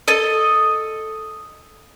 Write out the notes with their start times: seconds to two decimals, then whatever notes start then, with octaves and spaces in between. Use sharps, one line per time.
0.08 A4 D#5